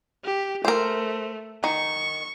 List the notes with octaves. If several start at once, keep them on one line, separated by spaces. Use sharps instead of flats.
G4
A3 A#4 C5
D#3 C#6